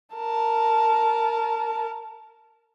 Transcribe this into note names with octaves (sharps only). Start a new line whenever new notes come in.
A#4 A5